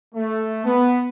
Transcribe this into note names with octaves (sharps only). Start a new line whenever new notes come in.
A3
B3